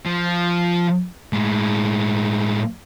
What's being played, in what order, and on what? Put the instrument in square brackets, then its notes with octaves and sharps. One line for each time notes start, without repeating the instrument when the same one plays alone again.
[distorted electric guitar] F3
A2 G#3